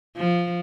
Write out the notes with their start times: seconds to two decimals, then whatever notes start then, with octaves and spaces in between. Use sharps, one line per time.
0.17 F3